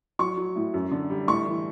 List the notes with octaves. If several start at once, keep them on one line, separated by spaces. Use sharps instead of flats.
F#3 C#6
F#3
A2
F#2
D3
G3
A2 C#6
E3